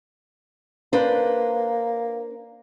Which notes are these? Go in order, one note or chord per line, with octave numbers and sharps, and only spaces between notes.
A#3 D4 B4 C5